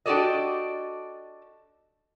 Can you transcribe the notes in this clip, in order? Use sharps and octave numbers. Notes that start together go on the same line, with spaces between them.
D4 F#4 G4 A4 D5 D#5